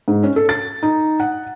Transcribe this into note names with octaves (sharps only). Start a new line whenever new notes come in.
G#2
C#4
A4
A6
D#4
F#5